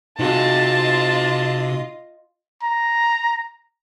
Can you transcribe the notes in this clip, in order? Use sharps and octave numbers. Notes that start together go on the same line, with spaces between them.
C3 D#4 F4 F#4 G#4 D#5 A5
A#5